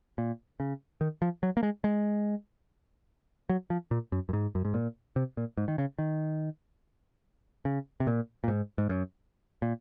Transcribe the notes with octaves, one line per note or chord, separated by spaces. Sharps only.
A#2
C#3
D#3
F3
F#3
A#3
G#3
G#3
F#3
F3
A#2
F#2
F#2
G#2
F#2
G#2
A#2
C3
A#2
G#2
D#3
C#3
D#3
C#3
C3
A#2
A#2
G#2
G#2
F#2
A#2